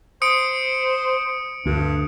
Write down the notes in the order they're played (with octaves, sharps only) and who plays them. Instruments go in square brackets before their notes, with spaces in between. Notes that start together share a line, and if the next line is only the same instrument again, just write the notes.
[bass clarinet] C5 [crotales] D#6 C#7 D7
[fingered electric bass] D2 [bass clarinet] G2